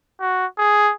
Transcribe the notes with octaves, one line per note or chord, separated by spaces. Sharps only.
F#4
G#4